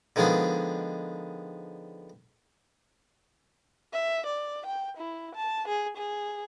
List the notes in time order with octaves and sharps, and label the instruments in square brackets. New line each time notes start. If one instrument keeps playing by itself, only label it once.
[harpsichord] D3 D#3 F3 G#3 B3 D4
[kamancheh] E5
D5
G5
E4
A5
G#4
G#4